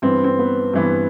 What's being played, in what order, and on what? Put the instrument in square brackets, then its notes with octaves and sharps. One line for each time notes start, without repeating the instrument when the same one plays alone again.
[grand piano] G2 E3 B3 [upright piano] C4
[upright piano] C4
B3
[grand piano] G2 E3 B3 [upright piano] C4